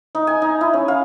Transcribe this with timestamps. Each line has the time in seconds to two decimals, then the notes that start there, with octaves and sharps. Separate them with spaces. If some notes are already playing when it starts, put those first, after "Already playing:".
0.15 D#4
0.27 G#5
0.42 D#4
0.61 E4
0.74 C#4
0.88 F5